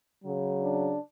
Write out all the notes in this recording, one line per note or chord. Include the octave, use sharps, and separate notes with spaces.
C#3 F#3
D4